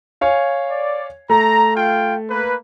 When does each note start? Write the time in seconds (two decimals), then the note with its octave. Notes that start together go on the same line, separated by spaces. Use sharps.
0.21 C#5 F5 G#5
0.70 D5
1.30 A3 A#5
1.75 F4 F5 G5
2.30 A#3 B4